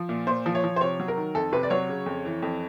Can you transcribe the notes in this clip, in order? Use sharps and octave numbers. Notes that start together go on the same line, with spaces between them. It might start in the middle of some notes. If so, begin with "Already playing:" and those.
Already playing: F3
A#2
A#2 C5
F3
C#5
F3
C5
C3 C#5
F#3
A#4
D#3
F2 A4
C3 B4
D5
F#3 C#5
C#3
F2
E3
F2